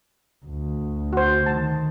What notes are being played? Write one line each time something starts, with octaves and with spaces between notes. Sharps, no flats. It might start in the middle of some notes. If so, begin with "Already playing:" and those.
D2
F#4 C5
D#3 A5